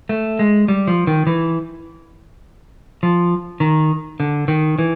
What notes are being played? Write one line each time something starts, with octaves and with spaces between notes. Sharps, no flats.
A3
G#3
G3
F3
D#3
E3
F3
D#3
D3
D#3
E3